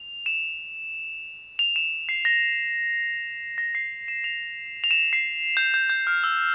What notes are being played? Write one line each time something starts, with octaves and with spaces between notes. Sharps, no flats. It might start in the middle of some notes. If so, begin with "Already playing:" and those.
Already playing: F7
E7
F7
E7
C7
A#6
A#6
C7
E7
F7
F7
E7
C7
G6
G6
G6
F6
E6